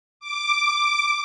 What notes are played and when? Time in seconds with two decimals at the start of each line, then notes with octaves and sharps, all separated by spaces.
0.20 D6